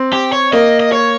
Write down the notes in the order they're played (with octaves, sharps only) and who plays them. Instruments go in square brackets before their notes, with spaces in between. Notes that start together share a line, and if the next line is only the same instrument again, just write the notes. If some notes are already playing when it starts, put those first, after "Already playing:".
Already playing: [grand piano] C4
[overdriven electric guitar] G4
C#5
[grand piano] A#3 [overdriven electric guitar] D#5
[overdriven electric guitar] D#5
C#5